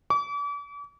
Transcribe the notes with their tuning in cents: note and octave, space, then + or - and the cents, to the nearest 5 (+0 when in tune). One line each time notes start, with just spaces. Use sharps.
D6 -40